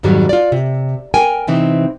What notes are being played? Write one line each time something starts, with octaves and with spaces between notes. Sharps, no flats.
F2 G#2 D#3 F#3 G3
F4 D5
C3
A#4 G5 G#5
C3 E3 C4 D#4